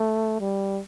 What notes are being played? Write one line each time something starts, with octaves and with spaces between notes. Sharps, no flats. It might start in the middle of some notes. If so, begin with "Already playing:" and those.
Already playing: A3
G3